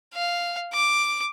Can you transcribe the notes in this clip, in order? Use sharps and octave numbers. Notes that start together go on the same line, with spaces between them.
F5
D6